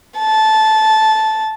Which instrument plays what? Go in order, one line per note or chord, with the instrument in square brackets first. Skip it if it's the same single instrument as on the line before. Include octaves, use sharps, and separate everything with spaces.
[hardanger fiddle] A5